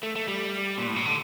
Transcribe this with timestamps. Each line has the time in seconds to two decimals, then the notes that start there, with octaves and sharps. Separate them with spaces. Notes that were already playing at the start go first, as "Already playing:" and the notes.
0.03 A3
0.16 A3
0.28 G3
0.78 A#2
0.87 A2
0.96 A#2
1.05 D3